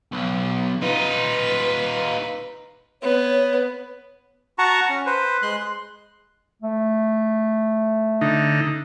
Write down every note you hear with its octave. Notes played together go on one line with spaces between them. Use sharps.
B1
D#4 F4 B4
B3 C#5
F#4 F#5 A5 A#5 C#6
C#4
B4 C5
G#3 C6 F#6
A3
D3 D#4